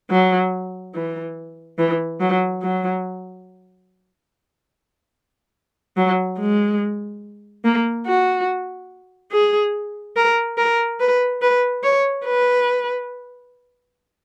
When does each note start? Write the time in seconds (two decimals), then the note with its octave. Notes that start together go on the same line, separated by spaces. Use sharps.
0.11 F#3
0.95 E3
1.78 E3
2.20 F#3
2.62 F#3
5.97 F#3
6.39 G#3
7.65 A#3
8.06 F#4
9.32 G#4
10.16 A#4
10.58 A#4
11.00 B4
11.42 B4
11.83 C#5
12.25 B4